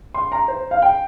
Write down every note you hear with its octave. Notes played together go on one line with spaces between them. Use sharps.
C6
A#5
C5
F5
G5